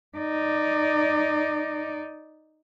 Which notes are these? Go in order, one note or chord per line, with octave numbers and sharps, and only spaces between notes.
D#4 D5